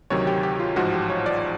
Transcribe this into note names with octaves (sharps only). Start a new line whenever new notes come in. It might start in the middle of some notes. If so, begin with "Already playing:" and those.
D2 C3 D#3 F#3 C#5
G4
G4
F4
A1 G#2 F3 F#4
G4
C#5
D5